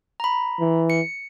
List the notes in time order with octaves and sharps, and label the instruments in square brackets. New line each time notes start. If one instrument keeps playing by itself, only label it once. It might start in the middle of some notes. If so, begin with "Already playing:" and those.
[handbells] A#5 B5
[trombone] E3
[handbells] C#7